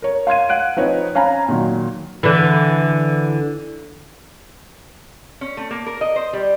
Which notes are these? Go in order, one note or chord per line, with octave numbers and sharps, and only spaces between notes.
A#4 C#5
F5 C6 G#6 D#7
F5 F#5 F#6 D7
F3 C4 D#4 B4 C#5 D#5
C#4 F5 G#5 A#5 B5
A#2 D#3 F#3
D3 E3
C#4
A3
A#3
A#4
D#5
C5
G3